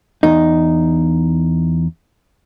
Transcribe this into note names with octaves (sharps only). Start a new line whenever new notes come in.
E2 D#4